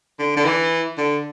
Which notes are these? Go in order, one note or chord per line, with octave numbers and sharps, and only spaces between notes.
D3
D3
E3
D3